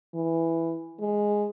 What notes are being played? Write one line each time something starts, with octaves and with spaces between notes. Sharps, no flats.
E3
G#3